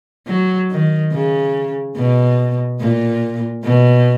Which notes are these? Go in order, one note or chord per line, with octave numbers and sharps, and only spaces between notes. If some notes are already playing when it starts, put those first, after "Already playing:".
F#3
D#3
C#3
B2
A#2
B2